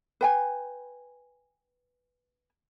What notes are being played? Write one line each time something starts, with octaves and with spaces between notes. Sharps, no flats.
B4 G5 G#5